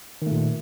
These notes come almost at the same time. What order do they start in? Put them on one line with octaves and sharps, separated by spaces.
D#3 A3 A#2